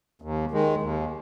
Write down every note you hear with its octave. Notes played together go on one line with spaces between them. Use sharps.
D#2
D#3 G#3
D#2